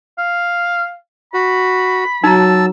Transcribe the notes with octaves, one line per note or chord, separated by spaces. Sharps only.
F5
F#4 B5
F#3 D#4 A5 A#5 E6